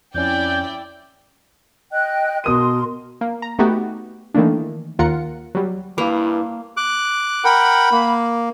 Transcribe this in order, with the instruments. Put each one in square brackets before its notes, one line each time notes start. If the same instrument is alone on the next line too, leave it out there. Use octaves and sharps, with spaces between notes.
[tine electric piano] F2 C#4 [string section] E4 D5 G5 [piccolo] G6
[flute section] D#5 G5 F#6
[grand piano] B2 D#6 D#7 [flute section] A#4 C6
[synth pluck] A#3
A#5
A3 B3 D#4 F#4 G4
D#3 E3 A3 A#3 D4
D#2 F4 A#4 F#5 C#7
F#3 G3
[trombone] G2 [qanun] A#3 [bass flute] E4 [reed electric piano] B4 F5
[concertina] D6 F#6
[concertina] A#4 F#5 G5 [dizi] B5
[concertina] A#3